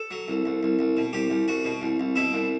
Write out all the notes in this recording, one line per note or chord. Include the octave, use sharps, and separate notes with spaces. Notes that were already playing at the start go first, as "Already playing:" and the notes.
Already playing: A4
F#3
C2
C2
C2
C2
B2
C2 G4
C2
C2 F#4
B2
C2
C2
B2 E4
C2